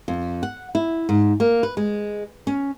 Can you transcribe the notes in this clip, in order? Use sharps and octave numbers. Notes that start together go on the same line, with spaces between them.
F2
F#5
E4
G#2
A#3
B4
G#3
C#4